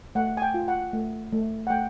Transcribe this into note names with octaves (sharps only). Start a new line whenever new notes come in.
A3 F#5
G#5
G5
F4
F#5
A3
A3
F#5
A3 G5